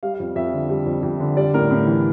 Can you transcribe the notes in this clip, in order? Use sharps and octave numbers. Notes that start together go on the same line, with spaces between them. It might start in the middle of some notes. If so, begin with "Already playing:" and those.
G3 F5
F5
F2
F2 E5
D3
G3
F2
F2
D3
G3 D5
A2 A#4
A2
E3